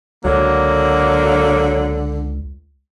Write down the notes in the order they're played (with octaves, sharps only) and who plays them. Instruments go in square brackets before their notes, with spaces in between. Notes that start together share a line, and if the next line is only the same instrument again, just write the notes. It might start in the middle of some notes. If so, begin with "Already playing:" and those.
[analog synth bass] C#2 [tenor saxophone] D3 [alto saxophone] F#3 [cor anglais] A#3